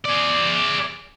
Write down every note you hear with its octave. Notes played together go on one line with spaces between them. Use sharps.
G#4 D5